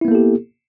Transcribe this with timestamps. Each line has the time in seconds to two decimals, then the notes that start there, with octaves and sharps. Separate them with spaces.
0.01 E4
0.05 B3
0.08 A#3
0.11 A4
0.15 G4